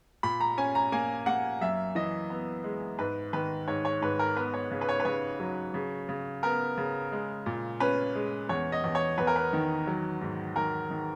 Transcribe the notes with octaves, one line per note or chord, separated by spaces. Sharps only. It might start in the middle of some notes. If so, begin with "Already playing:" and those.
A#2 B5
A#5
C#4 G#5
A#5
A#3 G#5
A#3 F#5
F#2 E5
E3 D#5
B3
G#3
G#2 B4
D#3 B4
G#2 C#5
C#5
G#2 B4
A#4
B3 B4
C#5
C#3
B4
C#5
B4
C#3 C#5
F#3
C#3
C#3
B3 A#4
C#3
G#3
A#2
C#4 B4
G#3
E2 C#5
D#5
E2
C#5
E2 B4
A#4
B4
D#3
F#3
G#2
D#3 A#4
D#3